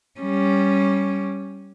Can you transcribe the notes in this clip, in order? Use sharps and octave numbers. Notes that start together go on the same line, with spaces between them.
G3 C#4